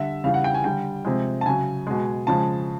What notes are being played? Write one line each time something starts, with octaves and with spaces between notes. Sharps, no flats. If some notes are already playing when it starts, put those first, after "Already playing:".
Already playing: D3 G3 E5
C#3 E3 G3 F5
F#5
G5
G#5
D3 G3 G5
C3 F3 G#3
A5
C#3 F#3 G#5
B2 G#3
C#3 F3 G#3 A5